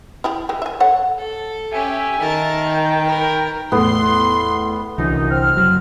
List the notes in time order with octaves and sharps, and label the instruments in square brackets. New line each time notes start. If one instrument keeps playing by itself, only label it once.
[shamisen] E4 G4 G#4
E3 G#3 G4
E5 G#5
A4 C#5 F#5
[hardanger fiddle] A4
[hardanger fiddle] C#4 G4 [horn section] E5 G#5
[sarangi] D#3 [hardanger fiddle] A#4 A5
[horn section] G5
[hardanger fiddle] A#4 B4
[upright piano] E2 A2 [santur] B3 [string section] C6
[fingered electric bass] C2 D3 E3 [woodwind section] F#2 D#4
[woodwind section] C4 F6
[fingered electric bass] F#1 F#3